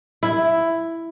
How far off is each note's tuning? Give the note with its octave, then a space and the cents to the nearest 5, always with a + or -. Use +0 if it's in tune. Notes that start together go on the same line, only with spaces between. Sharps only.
E4 +5